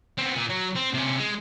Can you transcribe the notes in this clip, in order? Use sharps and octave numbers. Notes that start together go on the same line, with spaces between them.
B3 C4
A#2
F#3
C4
C3 C#4
G#3